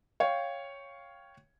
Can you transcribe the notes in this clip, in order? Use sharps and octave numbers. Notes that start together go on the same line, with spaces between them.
C#5 F5 G5